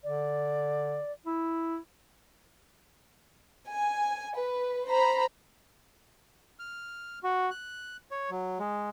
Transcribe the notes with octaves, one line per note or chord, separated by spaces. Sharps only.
D3 D5
E4
G#5
B4
C5 A#5 B5
F6
F#4
F#6
C#5
F#3
G#3